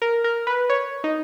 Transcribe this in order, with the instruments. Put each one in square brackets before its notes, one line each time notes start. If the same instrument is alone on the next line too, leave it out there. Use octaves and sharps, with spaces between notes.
[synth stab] A#4
A#4
B4
C#5
D#4